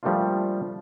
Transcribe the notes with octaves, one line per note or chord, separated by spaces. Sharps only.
F3 G3 A3 A#3 D4 F4